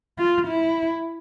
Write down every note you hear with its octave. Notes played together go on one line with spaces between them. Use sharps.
F4
E4